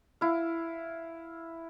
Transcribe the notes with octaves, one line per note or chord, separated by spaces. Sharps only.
E4 F5